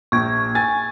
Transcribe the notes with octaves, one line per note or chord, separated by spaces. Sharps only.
A#1 C#6 G#6
G#5 A6